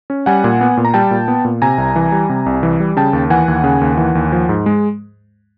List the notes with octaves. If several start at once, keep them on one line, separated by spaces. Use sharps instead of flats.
C#4
G3 F#5 G#5
A#2
B3
A#2
A#5
G3 G5 A5
A#2
B3
A#2
C3 G#5 A#5
C2
E3
G3
C3
C2
E3
G3
C#3 G5 A5
D#2
E3 F#5 G#5
D#2
C#3
D#2
E3
D#2
F3
G#2
G#3